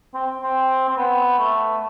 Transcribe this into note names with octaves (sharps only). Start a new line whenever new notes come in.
C4
C4
C4
B3
A3